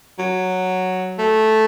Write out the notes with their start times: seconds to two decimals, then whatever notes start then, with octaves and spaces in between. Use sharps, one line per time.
0.19 F#3
1.19 A3